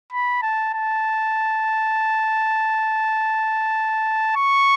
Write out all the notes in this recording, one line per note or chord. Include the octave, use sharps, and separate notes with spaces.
B5
A5
A5
C#6